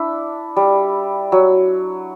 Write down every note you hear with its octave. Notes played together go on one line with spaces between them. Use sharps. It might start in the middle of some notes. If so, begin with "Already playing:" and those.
Already playing: D4 E4
G3
F#3